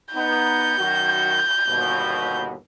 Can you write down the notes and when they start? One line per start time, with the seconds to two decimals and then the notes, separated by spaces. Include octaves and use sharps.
0.14 B3 D#4 G6
0.78 F#2 D#3 F#4
1.67 G1 D#2 B2